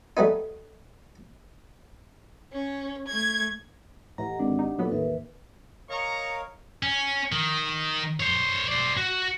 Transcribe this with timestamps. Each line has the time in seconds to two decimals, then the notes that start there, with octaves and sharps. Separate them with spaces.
0.17 G3 A3 B3 D#4
2.52 C#4
3.07 A3 G#6
4.18 A2 E3 G4 D#5 F#5 A#5
4.39 G#1 D4
4.59 D#4
4.79 A#2 F#3 B3 D#4 A4 B4
4.91 A1 D#2 A2 A#4 B4 E5
5.90 A#4 C#5 D#5 F5 A#5 C#6
6.83 C#4
7.32 D#3
8.20 C5 C#5
8.68 C5 D5
8.97 F#4